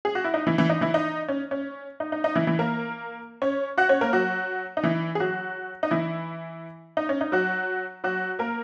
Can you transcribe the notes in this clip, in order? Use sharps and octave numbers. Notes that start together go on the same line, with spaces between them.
G#4
F#4
E4
D#4
E3 E4
E3 E4
D#4
E3 E4
D#4
C#4
C#4
D#4
D#4
D#4
E3 E4
E3 E4
A#3 A#4
C#4 C#5
F#4 F#5
C#4 C#5
A#3 A#4
F#3 F#4
D#4
E3 E4
G#4
F#3 F#4
D#4
E3 E4
D#4
C#4
D#4
F#3 F#4
F#3 F#4
A#3 A#4